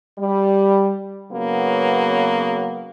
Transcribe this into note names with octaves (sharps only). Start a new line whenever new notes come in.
G3
C#3 F#3 A#3 B3